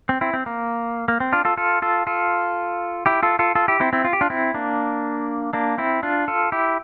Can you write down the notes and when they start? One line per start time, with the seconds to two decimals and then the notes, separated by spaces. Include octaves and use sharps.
0.09 C4
0.21 C4 E4
0.34 C4
0.46 A#3
1.08 A#3
1.20 C4
1.32 D4 F4
1.45 F4 A4
1.57 F4 A4
1.82 F4 A4
2.07 F4 A4
3.06 E4 G4
3.23 F4 A4
3.39 F4 A4
3.55 F4 A4
3.68 E4 G4
3.80 C4 E4
3.93 C4 E4
4.05 F4
4.13 G4
4.21 D4 F4
4.30 C4 E4
4.54 A#3 D4
5.53 A#3 D4
5.78 C4 E4
6.03 D4 F4
6.28 F4 A4
6.52 E4 G4